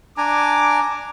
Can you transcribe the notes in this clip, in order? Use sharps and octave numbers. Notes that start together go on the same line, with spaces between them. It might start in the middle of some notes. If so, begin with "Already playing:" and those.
D4 G#5 A#5 D6